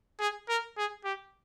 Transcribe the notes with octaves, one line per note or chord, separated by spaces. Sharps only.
G#4
A#4
G#4
G4